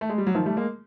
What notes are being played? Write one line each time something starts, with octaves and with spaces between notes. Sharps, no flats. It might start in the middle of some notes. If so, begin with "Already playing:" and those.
A3
G#3
G3
F#3
D#3 F3
G3 A3
G#3 A#3